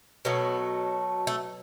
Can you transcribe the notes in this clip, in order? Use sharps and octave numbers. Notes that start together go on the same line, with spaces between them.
B2 F#3 A3 B3
A3